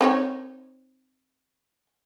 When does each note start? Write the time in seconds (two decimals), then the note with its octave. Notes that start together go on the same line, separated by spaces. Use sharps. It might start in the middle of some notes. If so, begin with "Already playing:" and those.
0.01 C4 D#4 C#5